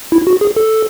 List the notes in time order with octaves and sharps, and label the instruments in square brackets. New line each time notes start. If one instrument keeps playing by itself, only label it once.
[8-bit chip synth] E4
F#4
G#4
A4